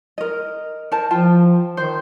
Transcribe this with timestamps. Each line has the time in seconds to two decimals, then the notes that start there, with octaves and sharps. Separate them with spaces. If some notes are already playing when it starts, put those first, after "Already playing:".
0.18 A#4 D#5
0.92 A#4 C5 A5
1.11 F3 F4 G5 A5
1.77 D#3 C5